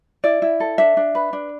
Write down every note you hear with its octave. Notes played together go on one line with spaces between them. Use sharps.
E4 D5
E4
A4
D4 E5
D4
B4
D4